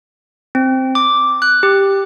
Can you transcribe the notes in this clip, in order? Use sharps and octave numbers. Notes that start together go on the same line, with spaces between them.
C4
D6
F#6
G4